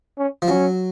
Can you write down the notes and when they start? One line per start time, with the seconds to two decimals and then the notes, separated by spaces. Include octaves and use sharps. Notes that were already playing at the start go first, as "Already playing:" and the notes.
0.18 C#4
0.42 F3
0.48 F#3 C#4